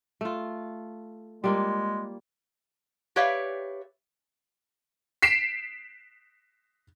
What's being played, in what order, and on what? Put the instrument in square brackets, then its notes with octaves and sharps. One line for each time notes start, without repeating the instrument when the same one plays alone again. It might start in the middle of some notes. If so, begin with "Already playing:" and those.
[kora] A3 F4
[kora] G3 A#3 F4 [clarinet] G#3
[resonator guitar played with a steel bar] G4 B4 C#5 D5 E5 F5
[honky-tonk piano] B6 C7 D7 E7